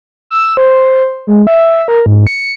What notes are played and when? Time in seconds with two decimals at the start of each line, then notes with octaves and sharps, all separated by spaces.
0.30 E6
0.57 C5
1.27 G#3
1.47 E5
1.88 A#4
2.06 G#2
2.27 C#7